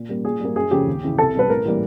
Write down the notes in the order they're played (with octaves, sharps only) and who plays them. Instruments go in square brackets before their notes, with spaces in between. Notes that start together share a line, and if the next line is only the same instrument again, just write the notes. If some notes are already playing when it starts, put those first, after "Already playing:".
Already playing: [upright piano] A#2
G3 A#3
A#2 G#4
G3 A#3
F#2 G#4
C#3 F3 A3 G4
D#2
C#3 E3
C2 A4
B2 G3 B4
A2 A#4
E3 G3 A#3